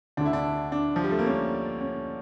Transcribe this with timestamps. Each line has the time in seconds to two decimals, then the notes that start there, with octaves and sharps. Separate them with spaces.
0.17 D2 D4
0.21 D3 E4
0.33 D4
0.72 D4
0.96 F3
1.04 G3
1.11 A3
1.19 A#3
1.26 C#4
1.81 C#4